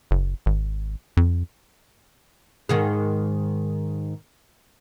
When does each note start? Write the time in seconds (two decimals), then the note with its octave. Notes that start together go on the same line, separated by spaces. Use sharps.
0.11 F#1
0.46 G#1
1.17 F2
2.69 G#2 D#3 G#4